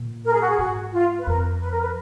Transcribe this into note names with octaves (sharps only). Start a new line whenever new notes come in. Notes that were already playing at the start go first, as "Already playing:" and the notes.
Already playing: A#2
A#4
G#4
F#4
G#4
G#2 F#4
F4
B4
F2 A#4
B4
A#4
B4